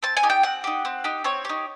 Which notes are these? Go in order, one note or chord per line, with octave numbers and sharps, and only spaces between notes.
C4 A5
G#5
D#4 G4
G5
C4 F#5
D#4 G4
C4
D#4 G4
C4 C#5
D#4 G4